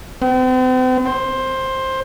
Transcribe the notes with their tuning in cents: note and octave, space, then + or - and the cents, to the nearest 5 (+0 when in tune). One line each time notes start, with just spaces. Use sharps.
C4 -40
C5 +15